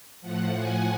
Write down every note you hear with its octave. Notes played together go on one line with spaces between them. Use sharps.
A2 F3 F#5
G#5